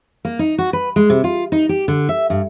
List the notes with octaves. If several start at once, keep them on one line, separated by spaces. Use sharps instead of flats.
A#3
D#4
F#4
B4
G#3
C3
F4
D#4
G4
D3
E5
G2